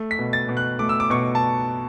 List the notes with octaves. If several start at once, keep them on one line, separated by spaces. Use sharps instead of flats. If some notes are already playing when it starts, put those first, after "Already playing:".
Already playing: A3
B6
B2
A6
B2
F#6
A3 D6
E6
D6
B2 C#6
A5